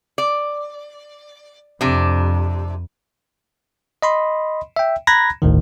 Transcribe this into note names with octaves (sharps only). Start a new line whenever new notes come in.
D5
F2 C3 D4
D#5 B5 C6
E5 G5
A#5 B5 F#6 G#6 A#6
G1 D2 A2 D#3